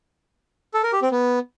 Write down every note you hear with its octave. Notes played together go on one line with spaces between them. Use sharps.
A4
A#4
G4
C4
B3